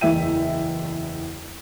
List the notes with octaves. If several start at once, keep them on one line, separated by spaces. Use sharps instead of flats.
F#1 E2 E3 E5 G5 D#7